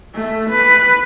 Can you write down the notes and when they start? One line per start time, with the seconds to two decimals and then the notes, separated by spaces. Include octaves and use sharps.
0.15 A3
0.50 B4